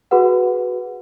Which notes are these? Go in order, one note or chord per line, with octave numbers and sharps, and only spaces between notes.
F#4 G#4 B4 F#5